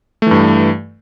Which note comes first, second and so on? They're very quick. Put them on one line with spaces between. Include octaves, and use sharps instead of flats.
A3 E3 G2